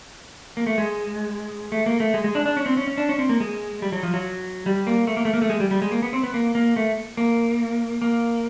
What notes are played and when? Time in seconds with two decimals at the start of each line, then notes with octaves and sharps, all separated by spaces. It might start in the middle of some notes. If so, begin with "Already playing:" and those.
0.57 A#3
0.67 A3
0.78 G#3
1.72 A3
1.86 A#3
2.00 A3
2.14 G#3
2.24 G#3
2.35 D4
2.46 D4
2.57 C#4
2.66 C4
2.77 C#4
2.87 C#4
2.98 D4
3.09 C#4
3.19 C4
3.29 A#3
3.40 G#3
3.82 G3
3.92 F#3
4.03 F3
4.14 F#3
4.66 G3
4.87 A#3
5.07 A3
5.17 A#3
5.25 A3
5.34 A#3
5.42 A3
5.50 G#3
5.60 G3
5.71 G3
5.82 G#3
5.92 A#3
6.02 B3
6.13 C4
6.23 B3
6.34 A#3
6.55 A#3
6.76 A3
7.17 A#3
8.02 A#3